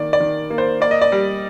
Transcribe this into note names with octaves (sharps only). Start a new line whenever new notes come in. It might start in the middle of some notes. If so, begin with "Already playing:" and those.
Already playing: D#3 A#3 D5
D5
D#3
A#3
C5
A#3 D5
D#5
D5
G3